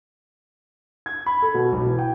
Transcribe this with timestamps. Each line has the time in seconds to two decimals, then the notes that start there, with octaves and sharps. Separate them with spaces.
1.06 G#6
1.26 B5
1.42 A4
1.54 B2
1.72 B1
1.86 E3
1.99 G5